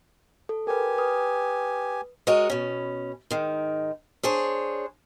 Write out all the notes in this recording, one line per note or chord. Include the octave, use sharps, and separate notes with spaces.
A4
G4 A#4 B4 G#5
B4 D#6
G#3 F#4 A#4 C#5 D#5 F#5
B2 C#4
G#2 D#3
D4 G#4 C5 C#5